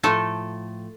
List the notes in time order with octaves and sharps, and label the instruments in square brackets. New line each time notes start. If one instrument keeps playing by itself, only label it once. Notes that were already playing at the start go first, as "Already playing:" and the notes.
[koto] A2 F3 A3 A4